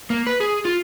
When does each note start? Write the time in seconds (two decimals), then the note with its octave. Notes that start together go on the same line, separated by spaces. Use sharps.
0.10 A#3
0.27 B4
0.40 G#4
0.65 F4